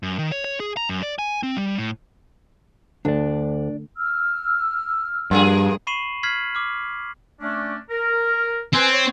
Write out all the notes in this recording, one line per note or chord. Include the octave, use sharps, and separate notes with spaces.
F#2
D#3
C#5
C#5
G#4
A#5
F#2
D5
G#5
C4
G3
A2
D2 D4 D5
E6 F6
G2 F3 A#3 G#4
B5 C#6 C7 D#7 E7 F#7
F6 G#6 B6 C7 F#7
D6 F6
A3 C#4 D4
A#4
C4 B4 G#5
C#5